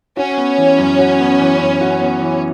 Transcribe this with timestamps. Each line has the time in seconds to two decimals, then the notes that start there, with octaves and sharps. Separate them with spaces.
0.17 C#4 F#4
0.38 B3
0.58 E3
0.79 F#2
0.99 F#4
1.20 B3
1.40 E3
1.61 F#2
1.81 F#4
2.01 B3
2.22 E3